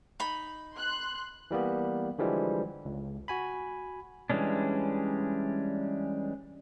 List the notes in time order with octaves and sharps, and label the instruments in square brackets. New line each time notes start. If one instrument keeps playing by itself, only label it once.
[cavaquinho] D#4 B5
[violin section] C6 F#6
[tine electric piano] E3 G3 A#3 B3
D3 E3 F3 G3 G#3
C#2
F#4 G#5 B5
[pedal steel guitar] E3 G3 G#3 C#4 D4